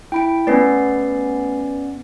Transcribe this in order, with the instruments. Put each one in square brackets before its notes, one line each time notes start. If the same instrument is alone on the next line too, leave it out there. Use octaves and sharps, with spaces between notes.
[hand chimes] E4 B5 D7 [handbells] G5
[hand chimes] A3 B4 C7 [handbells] B3 C#4 D5